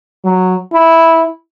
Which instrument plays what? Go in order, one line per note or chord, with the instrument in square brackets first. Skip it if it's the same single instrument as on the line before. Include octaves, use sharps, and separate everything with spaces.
[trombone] F#3
E4